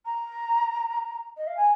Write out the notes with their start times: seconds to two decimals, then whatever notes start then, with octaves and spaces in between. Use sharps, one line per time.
0.05 A#5
1.37 D#5
1.47 F5
1.56 G#5